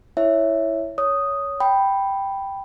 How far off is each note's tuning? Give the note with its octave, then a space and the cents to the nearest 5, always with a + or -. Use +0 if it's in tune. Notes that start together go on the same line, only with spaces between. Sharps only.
E4 +0 C#5 +0 E5 +0
C#5 +15 D#6 +0
G5 +0 B5 +0